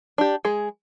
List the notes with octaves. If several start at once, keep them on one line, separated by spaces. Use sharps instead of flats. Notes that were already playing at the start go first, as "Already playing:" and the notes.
D4 G4
G#3 G#4